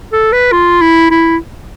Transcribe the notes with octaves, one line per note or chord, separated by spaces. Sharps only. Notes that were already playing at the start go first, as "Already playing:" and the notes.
A4
B4
F4
E4
E4